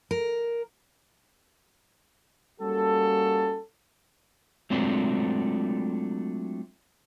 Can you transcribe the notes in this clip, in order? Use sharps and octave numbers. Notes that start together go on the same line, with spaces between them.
A#4
G3 A#3 C#4 F#4 A4
F#3 G#3 A3 C4 D4 F4